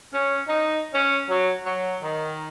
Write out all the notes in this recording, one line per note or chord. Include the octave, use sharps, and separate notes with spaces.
C#4
D#4
C#4
F#3
F#3
D#3